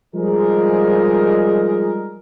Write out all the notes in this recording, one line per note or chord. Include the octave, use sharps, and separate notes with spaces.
F3 G3 G#3 D#4 G#4 A#4